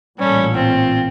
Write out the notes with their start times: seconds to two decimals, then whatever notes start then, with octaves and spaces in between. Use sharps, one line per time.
0.20 A1 A#2 G3 C#4 A4
0.54 C4 F4